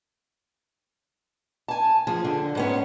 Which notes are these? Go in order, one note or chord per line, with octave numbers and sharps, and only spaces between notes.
G#5 A5
F2 F3 G#4 G#5
D3
G#2 B3 C#4